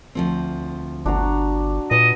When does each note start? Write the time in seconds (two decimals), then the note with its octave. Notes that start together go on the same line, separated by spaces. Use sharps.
0.15 D2 F3 C4
1.06 G1 D4 F#4 A#5
1.91 A#2 B4 D#5